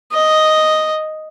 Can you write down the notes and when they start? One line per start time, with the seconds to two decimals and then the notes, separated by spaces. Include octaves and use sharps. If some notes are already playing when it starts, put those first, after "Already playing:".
0.12 D#5